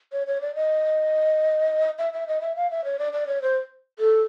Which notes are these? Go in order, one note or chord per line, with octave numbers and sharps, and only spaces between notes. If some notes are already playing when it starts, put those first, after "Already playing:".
C#5
C#5
D5
D#5
E5
E5
D#5
E5
F5
E5
C#5
D5
D5
C#5
C5
A4